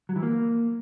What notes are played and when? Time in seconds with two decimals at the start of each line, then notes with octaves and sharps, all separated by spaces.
0.09 F#3
0.16 E3
0.23 A#3